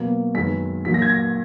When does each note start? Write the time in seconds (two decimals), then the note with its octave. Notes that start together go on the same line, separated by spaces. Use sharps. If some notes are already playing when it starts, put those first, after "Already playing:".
Already playing: B2 F#3 A#3
0.35 F#2 D#3 G#3 B3 B6
0.85 A#2 F#3 A#3 B6
0.94 A#6
1.02 G#6
1.09 A#6